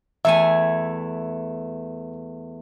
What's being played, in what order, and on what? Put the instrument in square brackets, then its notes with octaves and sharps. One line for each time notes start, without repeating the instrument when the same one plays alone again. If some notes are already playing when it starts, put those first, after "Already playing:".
[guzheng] E2 A3 G#5 [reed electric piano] E5